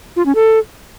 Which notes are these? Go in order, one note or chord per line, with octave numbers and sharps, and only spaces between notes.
F4
C#4
A4